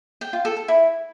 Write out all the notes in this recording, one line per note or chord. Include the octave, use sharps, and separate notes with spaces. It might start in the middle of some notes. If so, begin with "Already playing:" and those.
G5
F4
A4
A4
E4